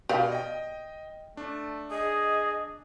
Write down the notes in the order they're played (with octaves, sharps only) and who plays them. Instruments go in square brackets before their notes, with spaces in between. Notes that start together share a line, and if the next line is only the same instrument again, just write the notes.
[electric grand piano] B2 [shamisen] G4 D5 F5
[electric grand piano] D#5 G5
[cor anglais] A3 [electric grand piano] D4
[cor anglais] G#4 [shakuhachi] D#5